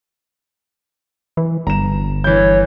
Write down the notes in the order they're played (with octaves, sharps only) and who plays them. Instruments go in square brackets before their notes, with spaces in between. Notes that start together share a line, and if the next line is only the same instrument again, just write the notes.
[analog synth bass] E3
[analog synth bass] G1 [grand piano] A#5 E7
[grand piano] E3 G6 [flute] C#5